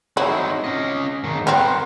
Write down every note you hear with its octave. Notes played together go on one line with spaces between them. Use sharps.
F#3 C4 D#4 E4
C#4 D#5
G#2 D#3
B3 C4 A#4 F#5